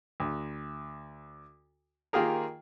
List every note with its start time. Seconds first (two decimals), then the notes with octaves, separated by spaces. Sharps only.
0.20 D2
2.13 D#3 A#3 F4 G4 G#4 A#4